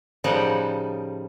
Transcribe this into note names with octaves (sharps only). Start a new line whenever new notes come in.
A2 C#3 F3 G3 D#4 F#5